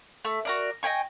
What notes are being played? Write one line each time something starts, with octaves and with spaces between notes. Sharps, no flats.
A3
F#4 A#4 D5
D#5 G5 G#5 C#6